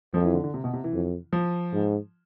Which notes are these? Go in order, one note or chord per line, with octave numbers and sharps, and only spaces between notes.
F2 F3
E3
D3
D3
C3
B2
C3
E3
F2
F3
G#2